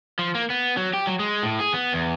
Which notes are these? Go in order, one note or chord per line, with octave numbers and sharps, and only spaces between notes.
F3
A#3
B3
F#3
G4
F#3
G#3
A2
G#4
B3
E2